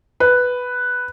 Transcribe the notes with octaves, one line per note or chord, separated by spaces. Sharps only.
B4